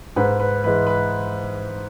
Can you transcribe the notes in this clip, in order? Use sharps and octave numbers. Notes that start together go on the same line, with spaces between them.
G#2 B4
B4
E3 G#3 B4
B4